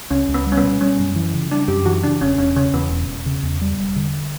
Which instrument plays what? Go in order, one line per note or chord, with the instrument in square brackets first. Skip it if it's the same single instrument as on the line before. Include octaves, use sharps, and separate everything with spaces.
[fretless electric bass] C#2 [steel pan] C#4
[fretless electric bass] C#2
[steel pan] B3
[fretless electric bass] G3
[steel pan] C#4
B3
[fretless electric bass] B2
[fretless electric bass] G3 [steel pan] C#4
[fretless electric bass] F#2
E3
C#3
[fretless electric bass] G3 [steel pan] D4
[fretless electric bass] F#2 [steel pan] G4
[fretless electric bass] E3 [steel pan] F#4
[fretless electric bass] C#3 [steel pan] D4
[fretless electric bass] E1 [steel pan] C#4
[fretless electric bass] E1 [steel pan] C#4
[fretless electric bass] C#3 [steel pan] C#4
[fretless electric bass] E2 [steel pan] B3
[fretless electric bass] E1
E1
C#3
E2
G3
E1
D3